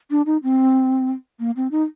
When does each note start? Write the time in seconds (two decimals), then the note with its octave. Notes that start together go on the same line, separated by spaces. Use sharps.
0.11 D4
0.26 D#4
0.43 C4
1.40 A#3
1.56 C4
1.71 D#4